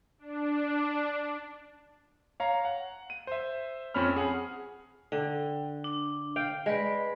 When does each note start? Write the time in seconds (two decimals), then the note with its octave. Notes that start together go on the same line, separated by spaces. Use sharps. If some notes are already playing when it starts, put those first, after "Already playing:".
0.19 D4
2.40 C#5 F5 A#5
2.65 F#5
3.10 D#7
3.27 C5 E5
3.94 F2 C4 C#4 C#5 B5 F6
4.16 G#4 F#5
5.12 D3 G5
5.84 D4
6.36 F5 G5
6.66 G#3 B4 D5 B5